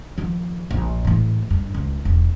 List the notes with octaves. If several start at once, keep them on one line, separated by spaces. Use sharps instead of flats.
D#3 F3
A#1
A2 E3
G2
C#2
E1